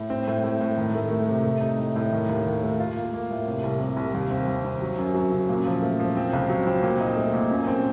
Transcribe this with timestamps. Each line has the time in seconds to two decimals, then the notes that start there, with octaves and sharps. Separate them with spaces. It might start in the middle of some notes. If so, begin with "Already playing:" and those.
Already playing: A2
0.10 C4
0.28 A2
0.44 A2
0.61 A2
0.78 D#3
0.95 A3
1.11 A3
1.28 C3
1.45 A3
1.61 D#4
1.79 A2
1.96 A2
2.12 D#3
2.29 D#2
2.46 D#3
2.63 A3
2.80 F4
2.96 A#3
3.14 A#3
3.31 A2
3.47 C3
3.64 C2
3.80 C3
3.97 C2
4.14 D#2
4.31 C4
4.48 D#2
4.64 C4
4.82 F#3
4.99 F#2
5.15 F#3
5.32 C#3
5.49 A#2
5.66 F3
5.82 A3
6.00 F3
6.16 C4
6.33 C#2
6.49 F#3
6.67 C4
6.83 A#2
7.00 D#4
7.17 A3
7.34 A#2
7.51 F#2
7.67 C4